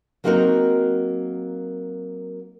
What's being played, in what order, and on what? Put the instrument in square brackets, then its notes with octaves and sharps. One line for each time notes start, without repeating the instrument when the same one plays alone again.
[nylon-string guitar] F#3 A#3 C4 D#4 F#4 A#4